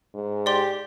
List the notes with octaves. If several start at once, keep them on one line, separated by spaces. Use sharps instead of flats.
G#2
G4 D5 C6